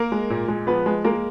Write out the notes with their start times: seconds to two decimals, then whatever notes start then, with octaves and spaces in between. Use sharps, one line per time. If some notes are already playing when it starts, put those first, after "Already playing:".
Already playing: A#3 A#4
0.12 G#3
0.30 A#2
0.48 G#3
0.67 F3 B3 B4
0.86 G#3
1.04 G#3 A#3 A#4